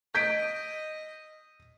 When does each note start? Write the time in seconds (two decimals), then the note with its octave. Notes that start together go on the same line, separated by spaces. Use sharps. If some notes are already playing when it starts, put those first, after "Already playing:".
0.15 D#5 G6 B6 D7